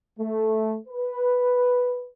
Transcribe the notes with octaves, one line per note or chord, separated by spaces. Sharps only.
A3
B4